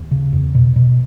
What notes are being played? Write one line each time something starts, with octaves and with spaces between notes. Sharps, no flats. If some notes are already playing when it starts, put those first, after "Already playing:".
Already playing: D#2
C#3
E2
B2
B2